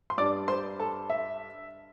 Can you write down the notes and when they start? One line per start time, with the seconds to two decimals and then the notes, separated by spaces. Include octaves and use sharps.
0.10 C6
0.17 G2 G3 D4 D5 D6
0.48 C5 C6
0.79 A4 A5
1.10 E5